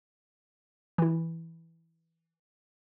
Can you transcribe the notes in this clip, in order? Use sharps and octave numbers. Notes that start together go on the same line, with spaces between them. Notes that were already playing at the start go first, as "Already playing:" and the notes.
E3 E4